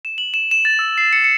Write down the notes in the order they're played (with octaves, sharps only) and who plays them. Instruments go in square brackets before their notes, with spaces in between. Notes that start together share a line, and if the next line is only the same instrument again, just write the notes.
[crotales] E7
F#7
E7
E7
A6
E6
C7
C#7
C#7